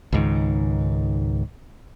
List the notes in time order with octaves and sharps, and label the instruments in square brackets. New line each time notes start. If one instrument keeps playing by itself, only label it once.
[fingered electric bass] C#2 G#2 D#3